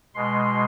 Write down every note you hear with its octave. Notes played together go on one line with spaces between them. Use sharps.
B2 G#3 C6